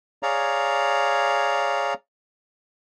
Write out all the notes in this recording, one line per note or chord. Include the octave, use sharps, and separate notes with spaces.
G#4 C#5 D5 F5 A#5